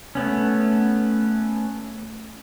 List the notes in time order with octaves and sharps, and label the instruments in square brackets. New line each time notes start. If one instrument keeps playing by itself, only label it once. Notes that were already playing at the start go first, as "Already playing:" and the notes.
[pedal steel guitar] A3 B3 C#4